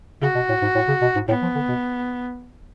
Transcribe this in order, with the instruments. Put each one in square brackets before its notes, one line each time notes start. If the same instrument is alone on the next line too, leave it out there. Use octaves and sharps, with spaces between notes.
[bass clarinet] C#3 [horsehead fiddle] F#4
[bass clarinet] B2
A2
G#2
A2
C#3
B2
G#2
[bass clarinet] A2 [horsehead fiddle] B3
[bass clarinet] F3
D3
B2